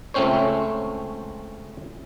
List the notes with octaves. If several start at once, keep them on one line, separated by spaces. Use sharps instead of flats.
C#2 A3 C4 C#4 C5 C#5